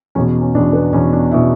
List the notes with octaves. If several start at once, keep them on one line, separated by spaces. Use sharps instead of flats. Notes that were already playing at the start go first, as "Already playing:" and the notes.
E2 B2 C#4
C#4
E2 B2 D4
B3
E2 B2 C#4
D4
B2 E4